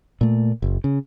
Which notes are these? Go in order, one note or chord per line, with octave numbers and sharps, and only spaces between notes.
A#2 A3
F#1
C#3